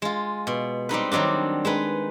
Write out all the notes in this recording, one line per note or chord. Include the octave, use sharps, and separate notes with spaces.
G#3 F4
B2
G3 C4 D#4 B4
D#3 F#3 G3 C4 D4
G#3 D#4 B4